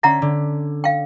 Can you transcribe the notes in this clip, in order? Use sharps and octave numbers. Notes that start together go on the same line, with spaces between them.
D3 C#4 E5 F#5 A#5 B6
D3
F5 G5